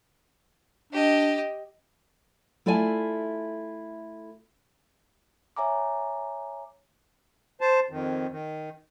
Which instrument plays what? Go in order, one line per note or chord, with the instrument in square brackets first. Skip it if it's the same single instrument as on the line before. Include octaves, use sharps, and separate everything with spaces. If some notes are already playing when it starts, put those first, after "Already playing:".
[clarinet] D4 [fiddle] G4 D#5
[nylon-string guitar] A3 E4 F4 D5 G#5 A5
[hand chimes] C#5 E5 G#5 A#5 D6
[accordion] C5 A5
F2 D#3
D#3